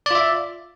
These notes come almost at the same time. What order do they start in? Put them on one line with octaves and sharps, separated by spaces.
D5 F4 E5